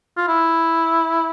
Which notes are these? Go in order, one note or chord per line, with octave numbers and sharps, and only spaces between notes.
F4
E4